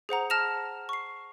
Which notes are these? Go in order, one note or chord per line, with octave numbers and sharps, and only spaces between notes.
G#4 C5 F#5 A#5
A5 F6 A#6 E7 F7
C#6 C7